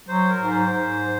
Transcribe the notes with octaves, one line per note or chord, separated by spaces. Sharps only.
F#3 C5
A#4
G#2
C5
G#2